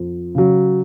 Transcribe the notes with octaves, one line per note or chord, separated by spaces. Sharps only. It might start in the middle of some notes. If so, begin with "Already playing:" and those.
Already playing: F2
C#3 F#3